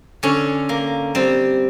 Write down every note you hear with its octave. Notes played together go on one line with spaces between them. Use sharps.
D3 C#4
A#3
G3 C4